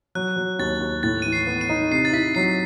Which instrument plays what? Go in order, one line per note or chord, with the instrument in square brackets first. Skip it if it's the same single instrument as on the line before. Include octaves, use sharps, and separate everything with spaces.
[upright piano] F#3 [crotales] F#6
[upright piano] F#3
[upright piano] D#2 [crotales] A6
[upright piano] D#2
[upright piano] A2 [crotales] A6
[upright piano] E3 [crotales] D#7
[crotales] C7
[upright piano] B3
[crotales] D#7
[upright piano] D#4
[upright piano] C3 [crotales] C7
[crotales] A6
[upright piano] E4 [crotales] B6
[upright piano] F#3 [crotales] C7